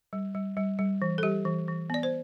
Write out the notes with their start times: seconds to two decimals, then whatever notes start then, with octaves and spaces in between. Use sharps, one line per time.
0.13 G3
0.35 G3
0.57 G3
0.79 G3
1.02 E3
1.18 A4
1.23 G3 G4
1.45 E3
1.68 E3
1.90 B3 D5
2.03 C5